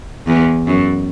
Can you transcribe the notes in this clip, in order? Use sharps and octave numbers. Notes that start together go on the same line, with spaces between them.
E2
F#2